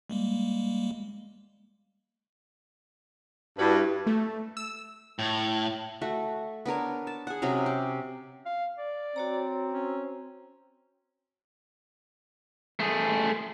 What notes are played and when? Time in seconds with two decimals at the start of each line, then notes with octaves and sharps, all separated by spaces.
0.10 G3 G#3 A#3
3.58 G2 E4 F#4 B4
4.06 A3
4.57 E6
5.19 A2
6.02 A3 F#4
6.66 B3 D4 A#4 C#5
7.07 A5
7.27 G#4 F#5
7.42 C3 F#3 C#4 A#5
7.66 G4
8.46 F5
8.78 D5
9.16 C4 F#4 C#5 A#5
9.72 C#4
12.80 A3 G#4